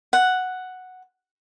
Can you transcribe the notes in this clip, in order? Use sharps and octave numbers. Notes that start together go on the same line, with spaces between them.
F#5